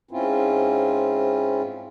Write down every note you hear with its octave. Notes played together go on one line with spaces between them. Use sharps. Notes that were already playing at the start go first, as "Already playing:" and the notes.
G#2 C4 C#4 E4 F4